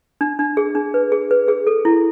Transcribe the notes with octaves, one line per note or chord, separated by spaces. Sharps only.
D4
D4
G#4
D4
B4
G#4
B4
G#4
A4
E4